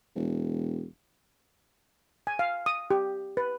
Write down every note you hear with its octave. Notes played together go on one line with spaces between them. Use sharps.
E1
G#5
F5
D#6
G4
B4